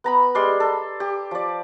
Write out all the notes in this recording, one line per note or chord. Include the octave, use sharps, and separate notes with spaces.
B3 A#5 B5
G3 G#3 D5 C6
A4
G4
F3 D5